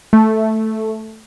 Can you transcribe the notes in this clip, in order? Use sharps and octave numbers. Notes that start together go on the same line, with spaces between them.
A3